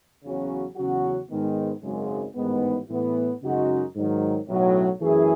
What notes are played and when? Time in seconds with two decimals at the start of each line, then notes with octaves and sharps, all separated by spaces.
0.23 E2 C#3 F#3 C#4 F#4
0.76 E2 C#3 F#3 C#4 F#4
1.30 G#2 D#3 G#3 B3
1.83 G#1 F#2 C#3 G#3
2.35 A1 G#2 D#3 G#3 B3
2.89 A2 E3 B3
3.42 F#2 C#3 G#3 D#4 F#4
3.95 G#2 D#3 F#3
4.48 B1 A2 F#3
5.01 F#2 E3 A3 E4 G#4